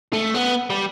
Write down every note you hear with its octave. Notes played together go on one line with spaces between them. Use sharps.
A3
B3
G3